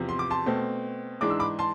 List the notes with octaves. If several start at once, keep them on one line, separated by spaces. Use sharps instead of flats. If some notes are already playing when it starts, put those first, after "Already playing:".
Already playing: E2 C3 F3
C6
D6
A5 C6
B2 A3 C4
G#2 E3 G#3 D4 D6
E6
B5 D6
A5 C6